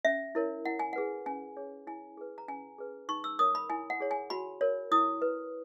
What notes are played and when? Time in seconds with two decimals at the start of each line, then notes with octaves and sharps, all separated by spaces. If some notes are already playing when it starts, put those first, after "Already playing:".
0.05 C#4 E5
0.35 E4 A#4 C#5
0.65 E4 F#5
0.79 G#5
0.93 G#4 B4 F#5
1.26 C#4 G#5
1.57 G#4 C#5
1.87 E4 G#5
2.17 G#4 B4
2.38 A#5
2.48 C#4 G#5
2.78 G#4 B4
3.09 D#4 C#6
3.24 E6
3.39 A#4 C#5 D#6
3.55 B5
3.70 E4 G#5
3.90 F#5
4.00 G#4 C#5
4.11 G#5
4.30 F#4 B5
4.61 A#4 C#5
4.91 E4 D#6
5.22 B4